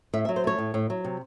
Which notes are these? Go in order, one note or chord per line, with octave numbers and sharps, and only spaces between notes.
A2 E5
E5
F#3
C5
A3 C#5
A2
A2
F#3
C3